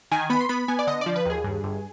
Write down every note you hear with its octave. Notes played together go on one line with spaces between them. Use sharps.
D#3 G#5
B3 B5
C6
B3 B5
B3 G#5
D5
D3 D#5
F3 D5
B4
D#2 G#4
G2
G1